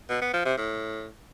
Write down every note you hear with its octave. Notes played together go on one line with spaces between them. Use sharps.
B2
B3
F3
C3
A2